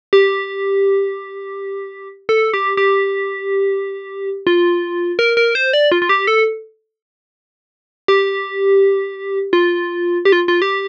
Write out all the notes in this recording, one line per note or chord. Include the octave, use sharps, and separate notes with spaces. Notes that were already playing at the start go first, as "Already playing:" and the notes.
G4
A4
G4
G4
F4
A#4
A#4
C5
D5
F4
F4
G4
A4
G4
F4
G4
F4
F4
G4